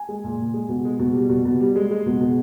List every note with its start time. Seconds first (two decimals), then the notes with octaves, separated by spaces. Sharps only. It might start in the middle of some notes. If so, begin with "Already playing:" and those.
Already playing: G#5
0.09 G#3
0.24 A#2
0.39 A#2
0.54 G#3
0.69 B2
0.85 G#3
0.99 B2
1.14 G3
1.29 B2
1.45 B2
1.60 G3
1.76 G#3
1.91 G#3
2.06 B2
2.21 B2